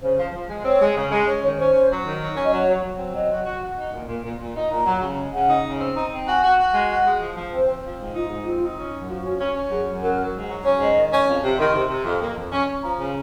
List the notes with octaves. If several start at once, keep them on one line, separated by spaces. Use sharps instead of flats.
C#3 C5
F3
F3
G#3
C4 C#5
G#3
C#3
G#3
C#4 C#5
D#3 C#5
C#4 C5
C#4
F#3
D#3
F#3
C#4
D#5
F#3 C#5
F#3
F#3
C4
F#3 D#5
F#4
F#4
F#4
D#4
A#2
A#2
A#2
A#2
D#4
A#2 A#5
F#3
C#3
G#3
C#3 F#5
D#4
C#3
C4
D#4 A#5
C4
F#4 G#5
F#4
F#4
G#3
F#4 F#5
G#3
F3
F3
C4 C5
C4
F3
G#2
D#4 F4
G#2
C4 F4
D#4
C#4
F#2
F3 F#4
C#4
C#4
C#4
F#2 G#4
F#2
F#3 A#4
F#3
G#2
F#3
C#4 C#5
G#2 D#5
D#3
C#4
F2
C3
D#3 C6
C3
C3
F2
A#3
F2
C#4
C#4
F3 A#5
C#3